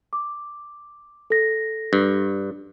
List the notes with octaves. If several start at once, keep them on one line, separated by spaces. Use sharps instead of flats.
D6
A4 A#6
G2